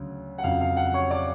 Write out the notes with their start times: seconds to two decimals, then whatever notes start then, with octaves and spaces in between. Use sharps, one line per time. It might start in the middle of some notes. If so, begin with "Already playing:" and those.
Already playing: D2 C#3 F#3
0.38 F#5
0.43 F2 C#3 F#3 F5
0.61 F5
0.77 F#5
0.94 C#5 C#6
1.11 D5 D6